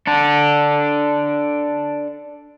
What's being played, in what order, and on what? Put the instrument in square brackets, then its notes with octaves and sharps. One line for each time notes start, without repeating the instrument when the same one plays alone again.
[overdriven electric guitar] D4 A4